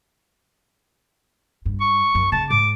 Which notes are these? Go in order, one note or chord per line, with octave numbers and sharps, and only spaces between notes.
G2
C#6
F#2
C#3 A5
G#2 D6